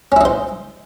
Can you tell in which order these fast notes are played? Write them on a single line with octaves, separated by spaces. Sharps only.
C#4 E4 D#4 C5